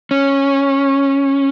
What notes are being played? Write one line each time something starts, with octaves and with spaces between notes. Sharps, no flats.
C#4